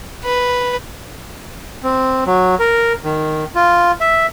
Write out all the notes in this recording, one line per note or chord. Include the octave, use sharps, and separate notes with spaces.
B4
C4
F#3
A#4
D#3
F4
E5